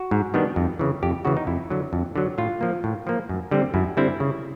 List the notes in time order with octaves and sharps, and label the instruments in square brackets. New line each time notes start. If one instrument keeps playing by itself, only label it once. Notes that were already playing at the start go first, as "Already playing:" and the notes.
Already playing: [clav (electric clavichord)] F#4
G#2
D#3 G3 B3 D4
F2
C#3 E3
F2 G4
C#3 E3 F#4
D#4
F2 E4
D3 F#3
F2
D3 F#3
A2 F4
F3 A#3
A2
F3 A#3
F#2
D3 G3 C4
F#2 E4
D3 G3 C4 E4
C#3